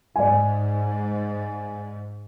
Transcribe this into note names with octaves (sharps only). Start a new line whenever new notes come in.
G#2 D5 G#5